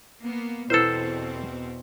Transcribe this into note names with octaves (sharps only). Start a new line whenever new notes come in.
A#3 B3
E2 B2 C4 E4 A4 B4 C5 E6